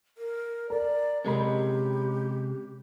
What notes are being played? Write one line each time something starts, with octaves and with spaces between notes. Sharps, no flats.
A#4
A#4 D5
C3 G#3 C#4 G4 A#4 D#5 B5